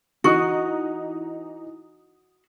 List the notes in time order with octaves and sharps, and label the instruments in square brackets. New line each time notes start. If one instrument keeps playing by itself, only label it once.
[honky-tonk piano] E3 D#4 D#6 [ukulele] F#4